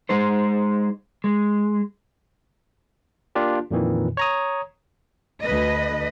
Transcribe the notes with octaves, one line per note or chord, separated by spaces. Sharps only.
G#3 D#4 C5
G#3
A#3 D4 F4 G4
F2 A#2 D#3 E3
C#5 A#5 D#6
D2 B4 D#5